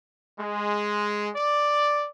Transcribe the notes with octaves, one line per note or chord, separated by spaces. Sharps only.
G#3
D5